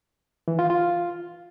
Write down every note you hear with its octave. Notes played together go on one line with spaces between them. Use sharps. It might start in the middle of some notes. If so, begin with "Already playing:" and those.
E3
F4
F4